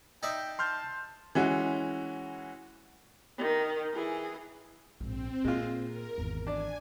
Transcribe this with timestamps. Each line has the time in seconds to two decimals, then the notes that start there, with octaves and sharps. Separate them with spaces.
0.23 D#4 D5 E5 G5
0.59 A5 C6 F6 G6
1.35 E3 G#3 C#4 E4 F#4
3.38 D#3
3.93 E3 G#4
5.00 A#1 G#2 C4
5.44 A#2 G#3 F4
5.84 A#4
6.18 G#1 E2
6.47 D4 D5 G#5